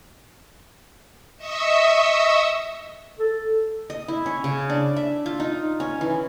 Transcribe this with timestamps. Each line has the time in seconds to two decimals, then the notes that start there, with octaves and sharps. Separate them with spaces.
1.37 D#5 E5 C#6 D#6 E6
3.19 A4
3.90 D#5
4.08 E4
4.26 C#4
4.44 C#3
4.70 D4
4.96 E5
5.26 F4
5.40 D#4
5.80 C#4
6.01 E3